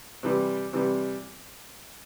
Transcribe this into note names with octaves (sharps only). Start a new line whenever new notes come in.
C3 E3 G3
C3 E3 G3